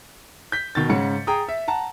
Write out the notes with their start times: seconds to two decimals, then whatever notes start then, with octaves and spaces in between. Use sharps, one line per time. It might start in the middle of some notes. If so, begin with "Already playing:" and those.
0.52 G6 B6
0.75 B2 D#3 A6
0.90 G#2 C#3 F#5 C#7
1.27 G#4 G5 A#5 D#6
1.48 E5
1.68 F#5 A5 A#5